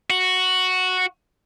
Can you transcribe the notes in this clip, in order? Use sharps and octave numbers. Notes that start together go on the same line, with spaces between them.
F#4